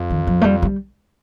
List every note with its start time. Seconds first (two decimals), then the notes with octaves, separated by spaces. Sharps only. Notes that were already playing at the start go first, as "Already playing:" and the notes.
Already playing: F2
0.10 D#3
0.27 F3
0.41 A3
0.45 G3
0.62 G3